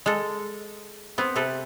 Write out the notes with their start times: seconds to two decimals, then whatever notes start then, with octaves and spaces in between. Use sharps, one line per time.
0.06 G#3 A4
1.18 B3 C4
1.36 C3 C4 G4 A4 B4